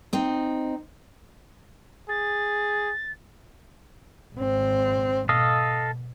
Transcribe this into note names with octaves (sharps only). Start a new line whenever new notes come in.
C4 D#4
G#4 A6
G#1 C4
B2 A4 D#5 F5